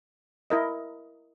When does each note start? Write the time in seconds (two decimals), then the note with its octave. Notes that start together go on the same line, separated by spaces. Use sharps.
0.50 E4 A#4 D#5